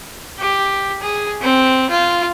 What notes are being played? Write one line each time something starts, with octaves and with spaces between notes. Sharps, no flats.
G4
G#4
C4
F4